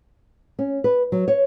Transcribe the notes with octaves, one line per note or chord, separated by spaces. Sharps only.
C#4
B4
F#3
C#5